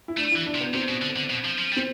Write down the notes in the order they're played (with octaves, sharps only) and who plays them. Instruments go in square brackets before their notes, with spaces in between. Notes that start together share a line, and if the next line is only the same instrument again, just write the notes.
[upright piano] E4
[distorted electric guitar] A3 [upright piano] D4
[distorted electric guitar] E3 [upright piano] E4
[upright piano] D4
[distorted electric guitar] C3
[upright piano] B3
[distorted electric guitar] C3 [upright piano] C4
[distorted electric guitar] B2
D3
D3
B2
F3
F3
G3
[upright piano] C4